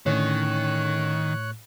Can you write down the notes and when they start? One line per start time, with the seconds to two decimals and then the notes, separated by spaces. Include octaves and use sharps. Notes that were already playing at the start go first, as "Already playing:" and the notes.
0.06 A2 D3 D#3 C#4 C#5 F#6